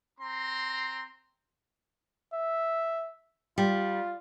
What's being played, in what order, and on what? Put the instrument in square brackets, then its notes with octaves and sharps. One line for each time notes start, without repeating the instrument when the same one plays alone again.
[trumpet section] C4 A#5 C6
[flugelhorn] E5
[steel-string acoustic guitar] G3 [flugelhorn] F4